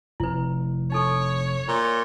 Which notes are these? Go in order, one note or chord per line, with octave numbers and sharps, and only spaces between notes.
F1 E4 B4
D#4 A4 C#5 C#6
A#2